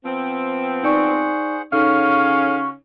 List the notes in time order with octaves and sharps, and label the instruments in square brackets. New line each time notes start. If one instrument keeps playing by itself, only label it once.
[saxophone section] F3 B3 C4
[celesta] D#4 D5 C#6 [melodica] G#4 C5 F#5
[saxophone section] C#3 C#4 [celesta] D#4 A4 [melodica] F#4 [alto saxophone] F5